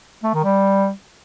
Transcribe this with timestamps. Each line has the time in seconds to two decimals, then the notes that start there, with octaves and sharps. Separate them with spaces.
0.24 A3
0.34 D#3
0.44 G3